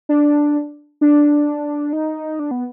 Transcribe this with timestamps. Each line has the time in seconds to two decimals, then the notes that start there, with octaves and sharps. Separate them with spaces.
0.09 D4
1.01 D4
1.93 D#4
2.39 D4
2.51 B3